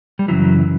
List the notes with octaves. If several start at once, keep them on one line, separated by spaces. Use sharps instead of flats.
G3
F#2 C#3 E3 F#3